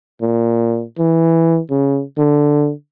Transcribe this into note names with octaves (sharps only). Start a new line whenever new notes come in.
A#2
E3
C#3
D3